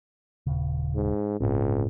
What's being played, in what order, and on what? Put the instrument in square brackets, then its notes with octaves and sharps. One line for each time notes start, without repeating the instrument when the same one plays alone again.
[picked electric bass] D#1 C#3
[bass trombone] G#2
[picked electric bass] G1 A2 C4 [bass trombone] C#2